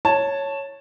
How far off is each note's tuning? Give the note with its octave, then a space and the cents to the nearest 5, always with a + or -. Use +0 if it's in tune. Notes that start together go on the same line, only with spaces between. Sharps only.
C#5 +0 A5 +0